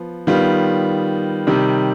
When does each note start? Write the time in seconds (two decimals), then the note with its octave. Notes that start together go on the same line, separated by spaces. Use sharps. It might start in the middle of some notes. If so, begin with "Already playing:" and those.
Already playing: F3 B3
0.27 D#3 G3 B3 F4
1.47 C3 D#3 G3